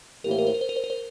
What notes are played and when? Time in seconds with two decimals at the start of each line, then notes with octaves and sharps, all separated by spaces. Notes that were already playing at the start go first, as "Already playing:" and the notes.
0.24 A2 E3 A#3 E4 G4 A#4
0.31 C5
0.38 A#4
0.47 C5
0.54 A#4
0.61 C5
0.69 A#4
0.76 C5
0.84 A#4
0.90 C5